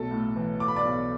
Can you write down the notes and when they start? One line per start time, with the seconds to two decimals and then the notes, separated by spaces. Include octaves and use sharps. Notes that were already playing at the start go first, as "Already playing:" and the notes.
Already playing: B1 A3 A4 A5
0.11 A2
0.36 E3
0.60 A3 D6
0.68 B5
0.76 D5 D6
0.85 B1